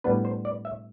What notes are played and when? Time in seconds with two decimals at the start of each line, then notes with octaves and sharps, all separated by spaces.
0.04 A2 G3 B3 D4 B4
0.25 C5
0.45 D5
0.65 E5